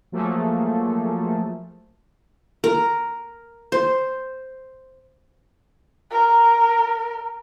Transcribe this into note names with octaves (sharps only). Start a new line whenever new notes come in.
F3 F#3 A3 A#3 G#4 A4
A#4
C5
A#4